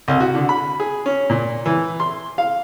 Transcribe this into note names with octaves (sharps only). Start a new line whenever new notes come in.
C2
F#4
D3
B5
G#4
C#4
A#2
E3
C6
F5